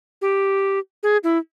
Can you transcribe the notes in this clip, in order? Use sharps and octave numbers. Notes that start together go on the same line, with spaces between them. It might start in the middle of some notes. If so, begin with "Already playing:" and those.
G4
G#4
E4